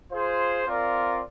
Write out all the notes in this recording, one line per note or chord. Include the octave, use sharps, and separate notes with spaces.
F4 G#4 C5
C4 F4 A#4 D5 F5